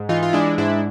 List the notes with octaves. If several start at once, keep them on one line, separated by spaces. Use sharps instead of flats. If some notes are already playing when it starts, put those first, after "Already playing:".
Already playing: G#2
E3 D#4 F4
F4
G#3 D4 E4
G#2 D4 E4